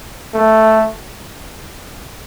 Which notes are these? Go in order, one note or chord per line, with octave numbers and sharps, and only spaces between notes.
A3